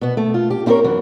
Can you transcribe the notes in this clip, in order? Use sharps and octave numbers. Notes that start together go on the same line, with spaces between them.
B2 B3
A3
F4
G4
C4 E4 G4 G#4 A#4 C#5
F#2 E3 F#4